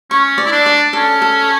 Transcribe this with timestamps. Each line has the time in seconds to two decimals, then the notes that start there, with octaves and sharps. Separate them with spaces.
0.11 C#4 C#6
0.38 D5
0.45 E4
0.52 D4
0.66 D5
0.93 C#4 A4
1.22 A4